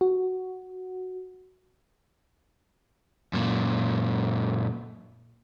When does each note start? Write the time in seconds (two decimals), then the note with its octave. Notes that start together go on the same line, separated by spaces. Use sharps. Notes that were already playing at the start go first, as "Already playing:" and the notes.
0.01 F#4
3.33 F#2 A#2